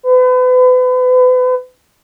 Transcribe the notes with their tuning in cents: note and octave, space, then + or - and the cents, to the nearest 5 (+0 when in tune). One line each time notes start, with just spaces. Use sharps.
B4 +35